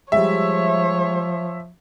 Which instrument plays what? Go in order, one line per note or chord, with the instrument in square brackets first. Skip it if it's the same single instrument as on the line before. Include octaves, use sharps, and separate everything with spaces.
[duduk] F3 [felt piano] G3 G#3 [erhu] C#5 [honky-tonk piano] E5